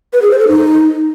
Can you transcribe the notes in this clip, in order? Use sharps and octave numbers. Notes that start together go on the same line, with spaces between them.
B4
G#4
C5
A4
D#4